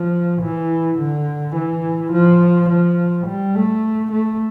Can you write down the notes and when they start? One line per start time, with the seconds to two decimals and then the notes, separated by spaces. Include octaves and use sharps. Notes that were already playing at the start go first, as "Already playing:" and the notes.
Already playing: F3
0.43 E3
0.99 D3
1.56 E3
2.12 F3
2.70 F3
3.27 G3
3.55 A3
4.12 A3